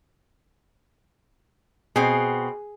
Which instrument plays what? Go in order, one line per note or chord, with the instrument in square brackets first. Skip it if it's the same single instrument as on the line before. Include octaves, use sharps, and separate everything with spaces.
[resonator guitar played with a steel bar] B2 C4 [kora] G#4